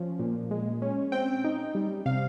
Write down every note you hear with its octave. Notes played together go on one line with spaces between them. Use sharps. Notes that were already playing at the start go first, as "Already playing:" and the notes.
Already playing: F3 C#4
A#2
G#3
C#4
C4 G5
D#4
G3
C3 F5